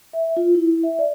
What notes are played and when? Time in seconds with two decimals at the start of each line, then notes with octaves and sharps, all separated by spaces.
0.13 E5
0.37 F4
0.55 E4
0.83 E5
0.99 D5